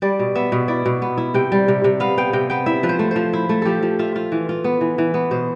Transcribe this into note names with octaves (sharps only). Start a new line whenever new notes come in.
G3 D5
B2
B3 E5
B2
E4 D5
B2
B3
E4
C3 G5
G3
C3
C3
B3 F5
B3 G5
C3 G5
B3 G5
E4 E5
F3 B4
C5
A3
F3 C5
E4
A3
F3 G4 A4
F3
F4 E5
F4
E3
F4
B3
E3
E3
B3
B2 C5